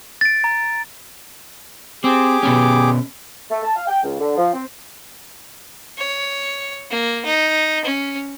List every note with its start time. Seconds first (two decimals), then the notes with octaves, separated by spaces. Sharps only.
0.21 A6 D7
0.44 A#5
2.04 C4 G4 G#4 D6
2.43 B2 B3 C#4
3.50 A3
3.64 A5
3.76 F5
3.87 G5
4.03 C#2
4.20 D3
4.37 F3
4.53 C4
5.98 C#5
6.90 A#3
7.25 D#4
7.84 C#4